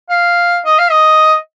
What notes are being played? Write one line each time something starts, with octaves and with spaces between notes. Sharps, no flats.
F5
D#5
F5
D#5